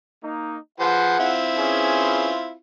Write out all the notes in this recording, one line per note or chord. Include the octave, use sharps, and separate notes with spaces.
A#3 D#4
F3 G#4 B4 C5 F#5
C4 E4 F4
C#4 G#4 B4